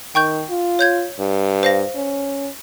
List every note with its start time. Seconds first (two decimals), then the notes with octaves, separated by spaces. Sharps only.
0.15 D#3 G5 C#6 G6
0.50 F4
0.79 C#5 G6 G#6
1.19 G2
1.63 C5 F5 A#6
1.95 C#4